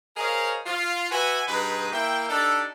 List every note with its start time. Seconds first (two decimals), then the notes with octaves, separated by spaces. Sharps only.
0.17 G#4 A#4 C5 C#5 D#5 F5
0.66 F4
1.10 F#4 B4 E5 F#5 G#5
1.46 G2 B2 D#4 G#4 B4
1.92 A#3 E4 E5 G5
2.28 D4 D#4 G4 A4